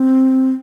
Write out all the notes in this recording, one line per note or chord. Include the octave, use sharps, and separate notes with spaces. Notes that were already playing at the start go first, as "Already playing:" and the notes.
Already playing: C4